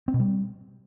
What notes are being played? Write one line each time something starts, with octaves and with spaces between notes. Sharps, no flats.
C4
B2
G3